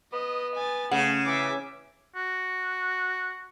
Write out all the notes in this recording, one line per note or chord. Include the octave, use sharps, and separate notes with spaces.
B3 D#5
G#5 A6
C#3 A3 F#5
E3 E5 D6
F#4